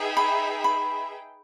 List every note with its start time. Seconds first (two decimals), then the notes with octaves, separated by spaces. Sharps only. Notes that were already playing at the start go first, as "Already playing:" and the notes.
Already playing: D#4 G#4 B4 E5 G5
0.17 B5
0.64 B5